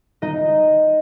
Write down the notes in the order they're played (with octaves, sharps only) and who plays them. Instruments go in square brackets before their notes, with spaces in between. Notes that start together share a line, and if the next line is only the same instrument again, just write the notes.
[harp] D#4 D#5